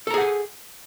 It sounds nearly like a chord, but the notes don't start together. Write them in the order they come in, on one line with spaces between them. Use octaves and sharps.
A4 A#5 G#4 F#5 G#5